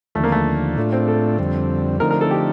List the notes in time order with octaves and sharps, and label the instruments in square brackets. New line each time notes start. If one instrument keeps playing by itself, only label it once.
[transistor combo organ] D#2 D3 F3 [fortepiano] A3
[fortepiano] A#3
A3
[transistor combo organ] A2 A3 D4 F4
[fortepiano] C4
A4
[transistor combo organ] F2 D3 G3 C4
[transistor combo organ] D3 F3 A3 C4 D#4 [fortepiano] A#4
[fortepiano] A#4
A4
G4